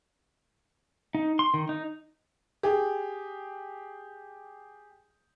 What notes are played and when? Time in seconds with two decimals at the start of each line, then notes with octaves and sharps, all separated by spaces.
1.15 D#4
1.39 C6
1.54 D#3
1.69 D#4
2.63 G4 G#4